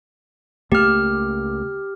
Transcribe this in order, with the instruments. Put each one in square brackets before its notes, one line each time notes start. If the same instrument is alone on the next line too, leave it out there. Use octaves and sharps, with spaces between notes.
[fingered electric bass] C#2 A3 A#3 [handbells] G4 F6